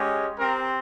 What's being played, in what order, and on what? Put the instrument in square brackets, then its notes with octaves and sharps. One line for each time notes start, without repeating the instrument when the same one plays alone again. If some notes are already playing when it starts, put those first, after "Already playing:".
Already playing: [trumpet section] G#3 C#4 G4
C4 G4 A#4